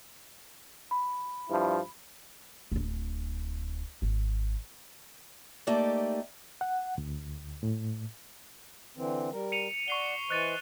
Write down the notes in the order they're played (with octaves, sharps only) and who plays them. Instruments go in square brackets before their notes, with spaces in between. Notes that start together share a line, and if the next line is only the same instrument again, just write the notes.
[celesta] B5
[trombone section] G2 F3 E4
[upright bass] D1 D4
G#1
[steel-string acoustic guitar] A3 A#3 D#4 G4 D5
[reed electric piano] F#5
D2
A2
[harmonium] D3 E3 C4
G3 A#4
[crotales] C#7 D#7 F7
[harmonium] D5 F#5 [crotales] C#6 C7 G7
[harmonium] E3 C5 D#5 [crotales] F#6 A6 D#7